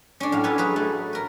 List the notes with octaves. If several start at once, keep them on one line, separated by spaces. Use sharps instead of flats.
C#4 D4
A2 F#3 F5
A4 B4 C#5 F#5 G#5
F#3 G#4 B4
A3
A#4 B4